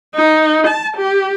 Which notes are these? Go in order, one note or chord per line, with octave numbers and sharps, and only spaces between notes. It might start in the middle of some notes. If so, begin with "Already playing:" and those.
D#4
A5
G4